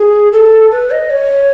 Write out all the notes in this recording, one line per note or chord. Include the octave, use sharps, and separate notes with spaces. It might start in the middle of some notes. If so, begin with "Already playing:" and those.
Already playing: G#4
A4
B4
D#5
C#5